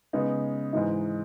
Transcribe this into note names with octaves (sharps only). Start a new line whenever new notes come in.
C#3 G#3 B3 D#4
G#2 E3 G#3 D#4